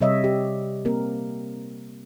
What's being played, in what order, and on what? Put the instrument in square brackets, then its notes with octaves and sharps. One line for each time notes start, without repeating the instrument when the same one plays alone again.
[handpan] C3 G3 C#5 D#5 E5
G4
A#3 C4 G4 A#4